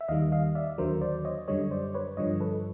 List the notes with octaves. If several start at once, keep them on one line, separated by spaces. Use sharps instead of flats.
E5
D#2 D#3 G3 D#5 F5
D#5 F5
D5 E5
D#2 D3 F#3 A#4 C5
C5 D5
C#5 D#5
F#2 D3 G3 C#5 D#5
C5 D5
B4 C#5
G2 D3 F3 C#5 D#5
A4 B4